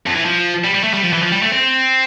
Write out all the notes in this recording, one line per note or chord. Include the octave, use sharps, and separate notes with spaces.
F2
E3
F3
G3
G3
A3
G3
F3
E3
F3
G3
A3
C4